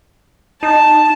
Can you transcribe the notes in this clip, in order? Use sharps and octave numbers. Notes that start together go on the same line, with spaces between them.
D#4 A5